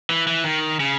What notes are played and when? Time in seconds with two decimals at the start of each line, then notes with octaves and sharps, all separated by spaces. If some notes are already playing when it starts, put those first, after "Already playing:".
0.10 E3
0.27 E3
0.44 D#3
0.80 C#3